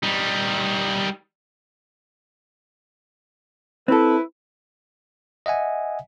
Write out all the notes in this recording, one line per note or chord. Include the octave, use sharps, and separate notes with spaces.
G3 D#4
C4 E4 A4 B4
D#5 E5 F#5 G#5